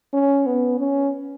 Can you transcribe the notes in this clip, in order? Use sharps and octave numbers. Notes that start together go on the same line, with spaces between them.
C#4
B3
C#4